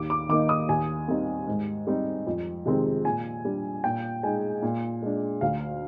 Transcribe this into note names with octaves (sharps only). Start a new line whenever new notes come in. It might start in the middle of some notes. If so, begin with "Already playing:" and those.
Already playing: D#2 D6
D6
D#3 A#3 D#4 D6
D#6
D#2 G#5
D#3 G3 C4
G#2
G3 C4 D#4
F2
C3 D#3 G#3 C4
A#2 G#5
G3 D4
A#2 G5
G#3 D#4 G#5
A#2
G#3 D4
D2 F5